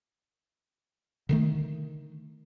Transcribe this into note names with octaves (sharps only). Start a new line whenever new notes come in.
D3 D#3 A3